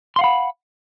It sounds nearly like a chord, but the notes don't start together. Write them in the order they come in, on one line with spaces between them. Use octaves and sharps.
C6 F5 F#5 B5